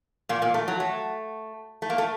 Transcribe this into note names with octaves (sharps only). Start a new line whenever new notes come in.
A#2 A#3
A#2 A#3
A3
F#3
A3
A3
A#3
A3